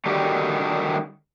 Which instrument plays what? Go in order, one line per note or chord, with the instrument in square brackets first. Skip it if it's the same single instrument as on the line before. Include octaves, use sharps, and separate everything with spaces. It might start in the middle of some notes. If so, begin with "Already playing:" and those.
[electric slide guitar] D3 D#3 G3 D#4 F#4 G4